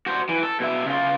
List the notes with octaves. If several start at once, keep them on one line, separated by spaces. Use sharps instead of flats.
F#4 C5
E3
A4
B2 E5
C#3 F4